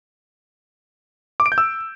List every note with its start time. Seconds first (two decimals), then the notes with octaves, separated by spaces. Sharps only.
1.40 D6
1.46 D7
1.52 G6
1.58 E6